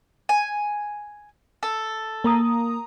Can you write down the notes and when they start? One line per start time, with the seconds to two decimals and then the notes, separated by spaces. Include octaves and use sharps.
0.29 G#5
1.63 A4
2.24 A#3 A#5 D#6